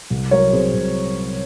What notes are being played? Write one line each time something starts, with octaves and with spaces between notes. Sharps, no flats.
C2
F#3 A#4 C#5
C3 G#4 C5
C2